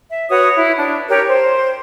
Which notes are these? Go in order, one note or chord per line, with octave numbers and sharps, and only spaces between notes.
E5
F#4 B4 C#5 D#6
E4
D4
G4 A#4 C#5
C5